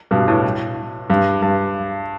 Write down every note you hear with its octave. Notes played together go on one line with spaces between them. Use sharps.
G2 B2
A2
G2
G2